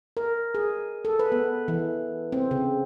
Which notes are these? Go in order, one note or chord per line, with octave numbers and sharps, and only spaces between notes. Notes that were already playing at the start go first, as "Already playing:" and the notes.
A#4
G#4
A4
B4
B3
E3
C4
C#3